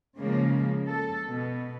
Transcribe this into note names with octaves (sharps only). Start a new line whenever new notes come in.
C#3 F3 G#3 A#3
A4
B2